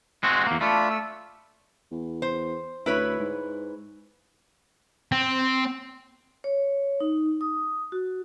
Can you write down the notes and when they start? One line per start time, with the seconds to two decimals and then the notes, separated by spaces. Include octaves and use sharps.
0.23 G#3 C4 F#4
0.47 E2 A#3
0.61 A3 D4 F4 B5
0.90 E6
1.92 E2
2.22 C5
2.86 D2 E4 B4 C#5
3.19 G#2
5.12 C4
6.44 C#5
7.01 D#4
7.41 D#6
7.92 F#4